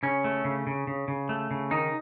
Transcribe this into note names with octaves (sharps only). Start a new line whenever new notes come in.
C#3 C#4
A3
C#3
C#3
C#3
C#3
A3
C#3
D#3 D#4